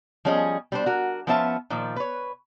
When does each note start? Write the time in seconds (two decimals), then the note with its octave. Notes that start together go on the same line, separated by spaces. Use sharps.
0.25 F3 G3 C#4 G#4 D5 D#5
0.72 G3 D4 C5
0.86 F#4 A#4
1.27 F3 B3 C#4 F4 E5 A5
1.70 A#2 D#3 F3
1.96 B4 C#5